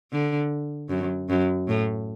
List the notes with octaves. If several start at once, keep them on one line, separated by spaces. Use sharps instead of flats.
D3
F#2
F#2
A2